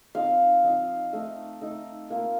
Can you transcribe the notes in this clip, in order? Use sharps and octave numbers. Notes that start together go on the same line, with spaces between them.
F3 C4 D#4 F5
F3 C4 D#4
A3 D#4
A3 D#4
A#3 F4